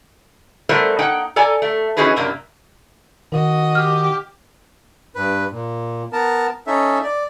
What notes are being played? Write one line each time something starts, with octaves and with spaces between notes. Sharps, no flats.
G3 A3 B3 A#4 C5 E5
A#3 D#4 F#5 G5
A4 D5 G#5 A#5
A3
E3 C#4 D#4 F#4 G#4 B4
F#2 C3 A#3 D4
D#3 F#4 D#5
G4 F6
G2 B4
A#2
B3 A#4 A5
C#4 D#4 A4 E5
D5